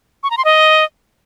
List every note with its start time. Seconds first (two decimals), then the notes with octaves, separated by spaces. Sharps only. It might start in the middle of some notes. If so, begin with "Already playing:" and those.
0.23 C#6
0.30 A#5
0.38 C6
0.45 D#5